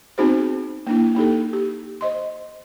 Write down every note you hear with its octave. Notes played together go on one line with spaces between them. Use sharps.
B3 C4 D#4 F#4 G#4 C5
A#3 D4 E4
A#3 D#4 G4 A4
G4
C5 D#5 C6